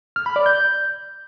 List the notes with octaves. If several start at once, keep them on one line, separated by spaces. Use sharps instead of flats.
F6
B5
D5
G6